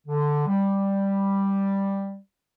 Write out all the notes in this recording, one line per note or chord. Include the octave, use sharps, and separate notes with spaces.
D3
G3